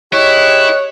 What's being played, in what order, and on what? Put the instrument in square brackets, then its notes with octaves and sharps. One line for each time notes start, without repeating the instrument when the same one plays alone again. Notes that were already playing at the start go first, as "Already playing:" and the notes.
[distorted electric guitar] E4 [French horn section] G4 G#4 D#5 [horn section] C#5 [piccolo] F#6